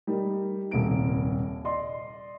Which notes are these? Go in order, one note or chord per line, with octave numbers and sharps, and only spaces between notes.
G3 D#4 G4 A#4
D#1 C2 A#3 D7
D5 D#5 C6